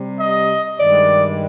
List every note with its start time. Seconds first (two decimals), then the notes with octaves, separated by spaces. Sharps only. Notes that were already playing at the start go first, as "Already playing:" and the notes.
Already playing: C3 G3
0.18 D#5
0.79 G2 D#3 G#3 D5